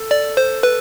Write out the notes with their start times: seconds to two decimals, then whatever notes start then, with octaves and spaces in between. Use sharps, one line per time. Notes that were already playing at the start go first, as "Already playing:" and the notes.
Already playing: A4
0.11 D5
0.37 C5
0.63 B4